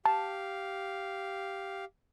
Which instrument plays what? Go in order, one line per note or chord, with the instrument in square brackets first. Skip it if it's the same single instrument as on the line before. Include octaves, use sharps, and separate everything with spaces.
[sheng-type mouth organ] G4 F5 [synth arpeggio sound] A5